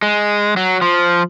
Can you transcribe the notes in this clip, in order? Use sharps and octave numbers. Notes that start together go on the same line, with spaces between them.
G#3
F#3
F3